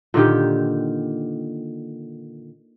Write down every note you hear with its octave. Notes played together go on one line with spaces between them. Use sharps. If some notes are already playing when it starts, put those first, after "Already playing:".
A#2 D3 D#3 G4